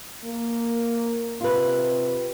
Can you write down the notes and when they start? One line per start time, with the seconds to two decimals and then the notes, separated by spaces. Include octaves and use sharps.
0.24 A#3
1.41 C3 F4 B4